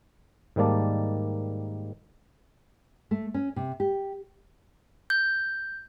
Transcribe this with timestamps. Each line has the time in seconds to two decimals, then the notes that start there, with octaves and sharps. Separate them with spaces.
0.56 G#2 D#3 G3 A#3 D5 A5
3.11 A3
3.34 C#4
3.56 C3
3.80 G4
5.10 G6